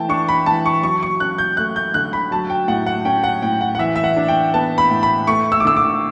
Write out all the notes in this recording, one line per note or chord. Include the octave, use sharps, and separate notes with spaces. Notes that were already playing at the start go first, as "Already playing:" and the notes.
Already playing: E3 A3 G5 A5
D4 C#6
B5
E3 A5
C#6
F#3 C#6
C#6
C#4 F#6
G6
A3 F#6
G6
D3 F#6
B5
F#3 A5
G5
A2 F#5
F#5
C#4 G5
F#5
A2 G5
F#5
F#5
E3 E5
E5
F#5
D4
G5
B3 A5
B5
A2
B5
A3 C#6
E6
D6
D3 E6
D6